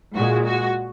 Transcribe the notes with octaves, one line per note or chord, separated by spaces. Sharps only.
A#2 G#3 F#4
F#4